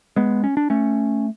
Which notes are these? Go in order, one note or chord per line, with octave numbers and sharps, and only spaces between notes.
G#3 B3
C#4
D4
A3 C#4